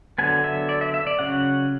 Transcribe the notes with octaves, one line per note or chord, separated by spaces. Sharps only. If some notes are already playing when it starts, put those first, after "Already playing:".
D3 F#3 B3 G#5
E5
D5
E5
E5
D5
C#3 F#3 C#4 F#5